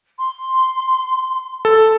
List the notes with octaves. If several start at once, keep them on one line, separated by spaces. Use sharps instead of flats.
C6
A4